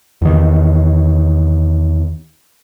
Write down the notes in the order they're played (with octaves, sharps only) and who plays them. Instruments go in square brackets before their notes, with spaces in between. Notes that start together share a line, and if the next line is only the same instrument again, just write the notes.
[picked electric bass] E2 D#3